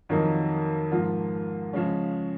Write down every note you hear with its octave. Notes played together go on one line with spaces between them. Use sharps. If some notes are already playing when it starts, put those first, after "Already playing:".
F2 D#3 F#3 A#3 D#4
G#2 F3 A#3 F4
C#3 F3 G#3 C#4